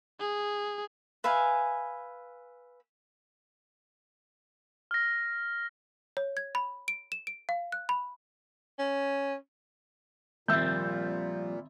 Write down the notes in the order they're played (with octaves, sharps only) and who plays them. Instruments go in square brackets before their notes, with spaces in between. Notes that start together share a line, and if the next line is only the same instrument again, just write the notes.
[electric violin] G#4
[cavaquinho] B4 E5 F5 G#5
[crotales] F6 A#6
[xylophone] C#5
G#6
B5
D7
E7
D7
F5
F#6
B5
[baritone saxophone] C#4
[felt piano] G#1 E5 E6 [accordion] A#2 [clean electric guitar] F3 G3 C4 [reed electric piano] G6